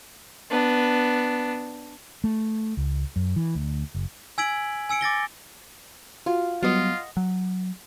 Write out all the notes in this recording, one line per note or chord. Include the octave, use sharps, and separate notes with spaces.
B3 D4
A3
C#2
F#2
E3
D2
F#1
G#5 E6 G#6 B6 D7 F#7
G#5 E6 C#7 D7
D6 A6 A#6 G7
F4 F#4
F#3 G3 B3 F4 D#5 F#5
F#3